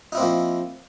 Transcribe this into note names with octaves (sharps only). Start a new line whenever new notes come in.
F3 A#3 C4 D#4 E4